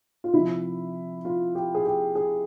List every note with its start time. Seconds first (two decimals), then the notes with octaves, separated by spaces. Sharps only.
0.24 F4
0.34 C3 F3 E4
1.25 F4
1.55 G4
1.75 G#4
1.85 G4
2.15 G#4